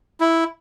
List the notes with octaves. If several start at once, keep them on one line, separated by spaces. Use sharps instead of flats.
E4